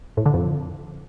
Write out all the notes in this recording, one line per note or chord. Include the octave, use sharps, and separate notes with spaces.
A2
D3
F2